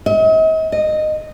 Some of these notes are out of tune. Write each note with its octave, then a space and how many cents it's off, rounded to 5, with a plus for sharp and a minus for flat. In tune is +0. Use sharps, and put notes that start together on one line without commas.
D#5 +40
D#5 -15